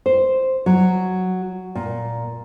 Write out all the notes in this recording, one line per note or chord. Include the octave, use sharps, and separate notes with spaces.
C5
F#3
A#2